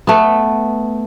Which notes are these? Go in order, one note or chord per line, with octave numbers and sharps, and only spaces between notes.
A3 B3